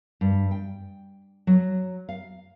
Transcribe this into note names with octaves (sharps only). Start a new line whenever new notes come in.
G2
G5
F#3
F5